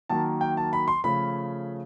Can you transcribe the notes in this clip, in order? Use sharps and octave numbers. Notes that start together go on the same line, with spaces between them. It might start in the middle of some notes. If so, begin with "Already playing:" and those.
D#3 F#3 A#3 A5
G5
A5
B5
C6
C#3 F3 A3 C#4 B5